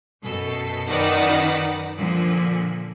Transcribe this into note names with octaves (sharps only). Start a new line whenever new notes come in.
F#2 B2 A4
F#2 D#3 D#4 B4 D5 F#5
A#2 D3 F3